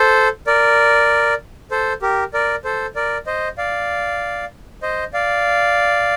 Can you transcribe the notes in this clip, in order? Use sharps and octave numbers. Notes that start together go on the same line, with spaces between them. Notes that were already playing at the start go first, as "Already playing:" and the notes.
Already playing: A4 C5
A#4 D5
A4 C5
G4 A#4
A#4 D5
A4 C5
A#4 D5
C5 D#5
D5 F5
C5 D#5
D5 F5